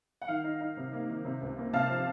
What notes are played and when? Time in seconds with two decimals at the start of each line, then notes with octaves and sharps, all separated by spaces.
0.22 F#5
0.28 D#3 F5
0.44 D#4
0.61 D#4
0.77 C3
0.93 A#3
1.10 D#3
1.25 C3
1.41 C#2
1.58 A#3
1.73 C3 F5 A5
1.90 F3